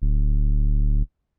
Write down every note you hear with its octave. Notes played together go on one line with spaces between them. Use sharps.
D1